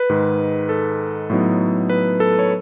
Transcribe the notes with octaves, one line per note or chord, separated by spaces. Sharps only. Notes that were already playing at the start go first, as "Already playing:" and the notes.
Already playing: B4
G#2 D#3 G#3
A4
A2 F#3 B3 D#4
B4
A4
C#5